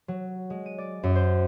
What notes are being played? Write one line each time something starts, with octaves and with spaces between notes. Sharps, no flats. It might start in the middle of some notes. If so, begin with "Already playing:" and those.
F#3
G#3
D#7
D5
F#2
C5